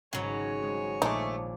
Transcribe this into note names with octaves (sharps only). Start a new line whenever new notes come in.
G#1 C#3 F#3 C#5 G#5
G#3 C4
A#1 G#3 A3 D#4 D6